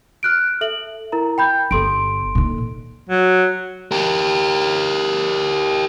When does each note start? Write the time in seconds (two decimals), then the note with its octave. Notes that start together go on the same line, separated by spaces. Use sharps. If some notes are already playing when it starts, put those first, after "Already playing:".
0.23 F6 F#6 D7
0.61 A4 E5 F#7
1.12 E4 A#4 A#5
1.38 G5 B5 G6
1.71 G1 A4 C6 D7
2.35 A#2 D#3
3.09 F#3
3.92 G4 A#4